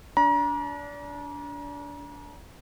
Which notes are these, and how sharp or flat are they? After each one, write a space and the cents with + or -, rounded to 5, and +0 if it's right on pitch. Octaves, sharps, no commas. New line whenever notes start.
D4 -25 A#5 +35